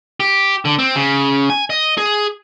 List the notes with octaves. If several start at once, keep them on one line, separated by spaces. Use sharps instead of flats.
G4
D3
C4
C#3
G#5
D#5
G#4